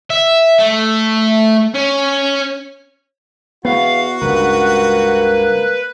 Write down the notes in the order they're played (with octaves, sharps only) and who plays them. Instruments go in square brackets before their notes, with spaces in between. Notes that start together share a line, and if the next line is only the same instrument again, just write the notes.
[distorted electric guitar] E5
A3
C#4
[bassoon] E2 [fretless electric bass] B3 [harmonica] F#4 [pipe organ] F5
[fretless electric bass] C#2 G2 [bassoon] A#3 [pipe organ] B4